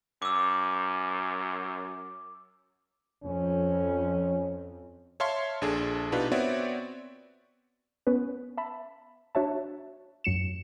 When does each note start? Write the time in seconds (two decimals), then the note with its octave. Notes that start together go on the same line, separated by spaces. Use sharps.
0.22 F#2 D6 E6
3.24 F2 C#4
5.20 C#5 E5 F5 A5 C6 C#6
5.61 A#1 D4 G#4 A4
6.12 B2 D4 D#4 F4 G4 B4
6.32 B3 C4 F#4 C#5 D5 E5
8.07 B3 C#4 B4
8.57 E5 A5 B5
9.35 D4 F#4 C#5 E5 A5
10.24 F#2 F#3 C#7 E7